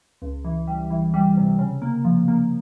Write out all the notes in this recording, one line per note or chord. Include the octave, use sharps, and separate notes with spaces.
C#2
E3
G3
E3
G3
C3
C#3
A#3
F3
A#3